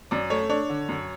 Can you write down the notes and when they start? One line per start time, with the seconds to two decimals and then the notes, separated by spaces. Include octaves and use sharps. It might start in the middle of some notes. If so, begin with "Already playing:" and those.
0.11 F#2 D5
0.30 A3 C#5
0.49 D4 C#5
0.69 D3
0.89 F#2